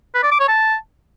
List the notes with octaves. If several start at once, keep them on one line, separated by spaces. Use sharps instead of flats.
B4
D5
D6
C#5
A5